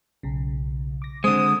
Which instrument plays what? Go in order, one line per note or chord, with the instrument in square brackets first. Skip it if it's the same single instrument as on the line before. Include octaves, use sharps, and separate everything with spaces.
[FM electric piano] B1 C#3
D6 A#6
[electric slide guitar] D3 G#3 [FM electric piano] C4 C5 [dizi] D#6